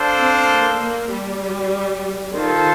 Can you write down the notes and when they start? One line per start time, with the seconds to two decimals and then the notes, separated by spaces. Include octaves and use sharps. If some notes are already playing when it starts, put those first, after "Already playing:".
Already playing: D4 A4 C5 F5
0.19 C4
0.50 A#3
0.81 A#3
1.11 G3
2.33 D#3 F4 A4 C5